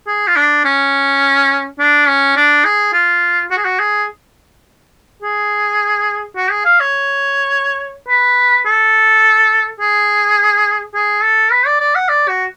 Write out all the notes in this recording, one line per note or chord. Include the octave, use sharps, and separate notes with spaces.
G#4
F4
D4
C#4
D4
C#4
D4
G#4
F4
F#4
G#4
F#4
G#4
G#4
F#4
G#4
F5
C#5
B4
A4
G#4
G#4
A4
B4
D5
D5
F#5
D5
F#4